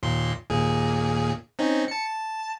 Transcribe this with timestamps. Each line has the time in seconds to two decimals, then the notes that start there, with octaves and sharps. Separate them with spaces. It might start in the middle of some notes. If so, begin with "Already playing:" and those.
0.03 D#2 A#2 C6
0.50 D#2 A#2 G#4
1.59 C4 C#4 D#4
1.88 A5 C#7
2.06 A5